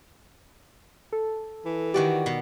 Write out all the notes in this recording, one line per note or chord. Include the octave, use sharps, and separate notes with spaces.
A4
E3
D#3 F#4 G4 D5
B2